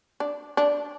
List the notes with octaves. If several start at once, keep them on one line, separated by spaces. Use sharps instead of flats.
D4
D4